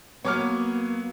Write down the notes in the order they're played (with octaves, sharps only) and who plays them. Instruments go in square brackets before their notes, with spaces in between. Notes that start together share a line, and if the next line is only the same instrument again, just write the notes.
[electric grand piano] F#3 B3 [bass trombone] A#3 [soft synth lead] F#4 [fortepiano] C#5 D6 F6